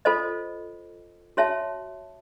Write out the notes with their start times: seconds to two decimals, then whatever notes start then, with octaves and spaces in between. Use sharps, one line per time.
0.05 F4 A4 C5 D#5
1.37 F#4 C#5 E5 A5